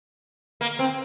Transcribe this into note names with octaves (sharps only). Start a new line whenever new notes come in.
A#3
C4